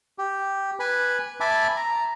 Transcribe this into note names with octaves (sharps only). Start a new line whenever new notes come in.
G4
B4 G#5 B5
E5 G#5 A5 B5 D6
A#5